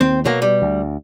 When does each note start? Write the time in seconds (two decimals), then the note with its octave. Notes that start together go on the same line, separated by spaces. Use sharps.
0.01 D#2 C4
0.25 B2 F#3 A#3
0.42 G3
0.62 D2